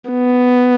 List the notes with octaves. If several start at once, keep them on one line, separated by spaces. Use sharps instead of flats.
B3